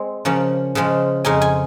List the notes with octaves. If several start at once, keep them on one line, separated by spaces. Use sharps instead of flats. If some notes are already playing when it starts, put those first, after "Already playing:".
Already playing: G#3 C4
C#3 F3 A#3 C#4
C#3 F3 G#3
F2 C#3 G#3 D#4 G#5
G#5